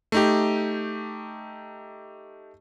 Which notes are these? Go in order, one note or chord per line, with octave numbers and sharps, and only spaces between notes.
A3 D#4 G4